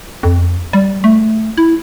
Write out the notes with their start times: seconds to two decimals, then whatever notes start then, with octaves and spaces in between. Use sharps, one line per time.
0.23 F2
0.73 G3
1.04 A3
1.58 E4